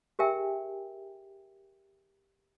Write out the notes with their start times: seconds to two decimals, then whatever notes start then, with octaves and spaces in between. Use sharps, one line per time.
0.19 G4 G#4 A#4 E5 G5 G#5